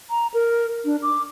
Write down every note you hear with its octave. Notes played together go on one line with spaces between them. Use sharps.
A#5
A#4
D4
D6